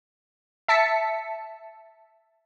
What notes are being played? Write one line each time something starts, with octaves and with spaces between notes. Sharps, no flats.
E5 A5 B6 C#7